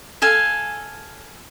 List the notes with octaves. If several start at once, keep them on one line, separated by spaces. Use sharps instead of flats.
A4 F5 G#5